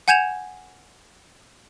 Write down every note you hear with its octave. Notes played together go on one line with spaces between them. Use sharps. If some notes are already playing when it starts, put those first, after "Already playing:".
F#5 G#5 G6 G#6 E7 F7